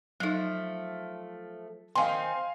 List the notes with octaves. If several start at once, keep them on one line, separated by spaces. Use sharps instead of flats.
F3 F#3 A3 D#4
D#3 C4 F5 G#5 C6